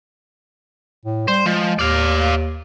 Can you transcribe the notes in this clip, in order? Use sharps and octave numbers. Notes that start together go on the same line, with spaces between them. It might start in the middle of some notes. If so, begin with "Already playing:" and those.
A2
G3 C5
F3 G#3
D#2 D5 F5